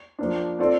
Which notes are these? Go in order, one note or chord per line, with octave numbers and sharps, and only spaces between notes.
F3 A#3 D4
C4 F4 A4 D5